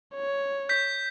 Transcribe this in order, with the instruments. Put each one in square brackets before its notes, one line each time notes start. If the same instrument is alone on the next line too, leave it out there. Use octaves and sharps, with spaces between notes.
[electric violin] C#5
[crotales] G6 B6